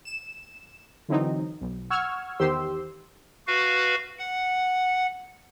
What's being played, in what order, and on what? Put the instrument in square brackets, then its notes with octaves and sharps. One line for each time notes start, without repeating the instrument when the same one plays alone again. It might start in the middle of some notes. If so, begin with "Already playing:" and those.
[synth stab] E7
D3 E3 F#3 C4 D#4
B1
F#5 C#6 E6 F6 G#6
E2 D#3 G4 C5 C6 E6
[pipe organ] F#4 B4 F5
F#5